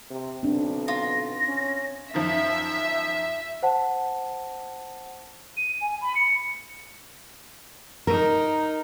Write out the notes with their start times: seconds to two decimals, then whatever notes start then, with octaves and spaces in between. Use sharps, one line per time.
0.10 C3
0.43 B1 C4 D4
0.88 F4 A#6
1.48 C#4
2.14 F#2 D#3 F3 E5
3.63 C5 F#5 A5
5.57 D#7
5.81 G#5
6.02 B5
6.16 C#7
8.07 D#4 A#4